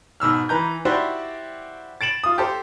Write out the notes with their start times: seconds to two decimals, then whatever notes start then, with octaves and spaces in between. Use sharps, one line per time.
0.20 G#2 B2 E6 F6
0.49 E3 B4 A#5 G6
0.85 E4 F#4 G4 C5 D5
2.01 A6 D7 E7 F#7
2.24 F4 D#6
2.38 G4 A4 C5